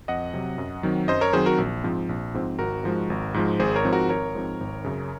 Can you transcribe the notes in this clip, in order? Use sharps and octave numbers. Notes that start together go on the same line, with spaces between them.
F2 D#5 F#5
C3 F#3
F#2
D#3 F#3 C4
F#2 C5 D#5
A#4 C#5
D#3 F#3 C4 G#4 C5
F#4 A#4
A#1
G#2 F3 C4
A#1
G#2 F3 C4
G#1 F#4 A#4
G#2 F3 G#3
G#1
G#2 F3 G#3
G#1 G#4 C5
A#4 C#5
G#2 F3 C4
F#4 A#4
G#1 A#4 C#5
G#2 F3 C4
G#1
F#2 C#3